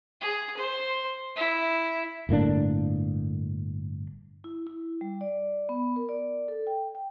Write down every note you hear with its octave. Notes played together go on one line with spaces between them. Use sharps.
G#4
C5
E4
G1 A2 A#3 D4
E4
E4
G3
D5
B3
A#4
D5
A4
G5
G5